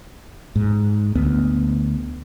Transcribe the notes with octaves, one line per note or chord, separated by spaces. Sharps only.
G#2
D2 B3